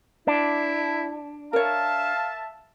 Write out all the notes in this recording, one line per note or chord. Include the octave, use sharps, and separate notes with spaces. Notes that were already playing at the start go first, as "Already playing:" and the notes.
D4 E4
A#4 C#5 E5 F5 A5